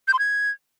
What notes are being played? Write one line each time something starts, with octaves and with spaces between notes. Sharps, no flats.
G6
C6
G#6